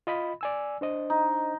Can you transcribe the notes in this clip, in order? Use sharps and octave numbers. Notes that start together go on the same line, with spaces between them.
F4 D#5 B5
D5 G#5 E6
D4 C5 D#5
D#4